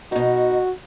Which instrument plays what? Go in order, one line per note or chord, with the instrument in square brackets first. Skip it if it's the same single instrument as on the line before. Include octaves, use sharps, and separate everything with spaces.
[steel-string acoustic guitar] B2 D#4 [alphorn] F#4